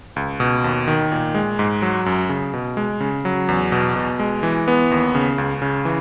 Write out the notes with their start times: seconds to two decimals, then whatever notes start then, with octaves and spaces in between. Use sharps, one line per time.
0.16 C#2
0.40 B2
0.64 D#2
0.88 D#3
1.11 A#2
1.35 G#3
1.59 G#2
1.82 F#3
2.06 F#2
2.29 C#3
2.53 B2
2.77 G#3
3.00 C#3
3.25 F#3
3.49 E2
3.72 B2
3.96 B2
4.20 G#3
4.43 E3
4.68 B3
4.91 D#2
5.15 C#3
5.38 C#2
5.62 C#3
5.85 E3